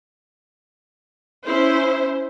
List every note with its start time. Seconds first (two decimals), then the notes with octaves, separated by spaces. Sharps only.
1.47 C#4 E4 C5